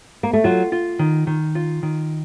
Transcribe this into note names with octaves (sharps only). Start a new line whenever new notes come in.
A#3
A3
F#3 F4
F4
D#3
D#3
F4
D#3